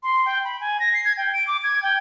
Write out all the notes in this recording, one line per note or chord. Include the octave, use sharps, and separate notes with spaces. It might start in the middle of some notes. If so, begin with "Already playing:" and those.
C6
G5
B5
G#5
A#6
C7
G#6
G5
D7
D6
G#6
G5